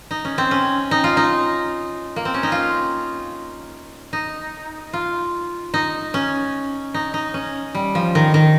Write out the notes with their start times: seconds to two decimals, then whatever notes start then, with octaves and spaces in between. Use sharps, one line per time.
0.11 D#4
0.25 C#4
0.38 C4
0.51 C#4
0.91 D#4
1.04 F4
1.17 D#4
2.16 A#3
2.25 C4
2.34 C#4
2.43 D#4
2.52 F4
4.13 D#4
4.93 F4
5.74 D#4
6.14 C#4
6.94 D#4
7.14 D#4
7.34 C#4
7.75 G3
7.95 F3
8.15 D#3
8.34 D#3